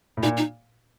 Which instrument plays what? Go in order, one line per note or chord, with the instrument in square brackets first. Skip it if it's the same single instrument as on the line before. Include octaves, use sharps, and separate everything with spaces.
[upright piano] A2
[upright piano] A#2 [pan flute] D#4
[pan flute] D#4